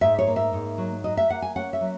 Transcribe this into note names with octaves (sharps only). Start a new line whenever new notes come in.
G#2 E5
C#5
A#3
E5
G#2
F#3
F#3 D#5
E5
A#3 F#5
G#5
C#4 F#5
E5
F#3